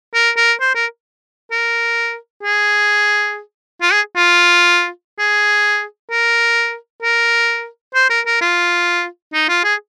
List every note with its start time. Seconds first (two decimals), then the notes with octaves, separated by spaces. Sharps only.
0.14 A#4
0.37 A#4
0.61 C5
0.75 A#4
1.51 A#4
2.43 G#4
3.82 F4
3.93 G#4
4.16 F4
5.19 G#4
6.11 A#4
7.03 A#4
7.95 C5
8.10 A#4
8.26 A#4
8.41 F4
9.34 D#4
9.49 F4
9.64 G#4